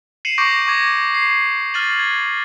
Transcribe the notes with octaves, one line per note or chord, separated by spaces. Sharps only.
C7 C#7 D#7 E7 F#7
C#6 D6 G6 A#6 D7
C#6 D6 G#6 A#6
C7
F6 A6 D#7 F#7
G#6